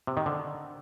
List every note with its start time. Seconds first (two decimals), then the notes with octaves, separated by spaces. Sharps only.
0.07 C3
0.17 D#3
0.26 D3